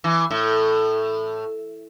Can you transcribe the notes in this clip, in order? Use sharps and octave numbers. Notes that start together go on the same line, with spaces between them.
E3
A2